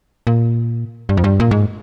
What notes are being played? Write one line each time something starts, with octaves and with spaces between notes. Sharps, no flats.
A#2
G2
F2
G2
A#2
G#2